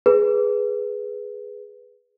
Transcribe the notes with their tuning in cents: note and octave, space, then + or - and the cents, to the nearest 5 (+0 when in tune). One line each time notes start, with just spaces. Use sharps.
G#4 +0 B4 +0